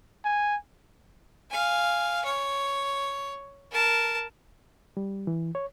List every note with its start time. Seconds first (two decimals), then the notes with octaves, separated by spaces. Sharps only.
0.25 G#5
1.50 F5 G#5
2.25 C#5
3.71 A#4 A5
4.97 G3
5.27 E3
5.55 C#5